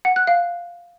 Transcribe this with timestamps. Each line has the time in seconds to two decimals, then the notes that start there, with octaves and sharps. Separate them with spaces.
0.05 F#5
0.16 F#6
0.27 F5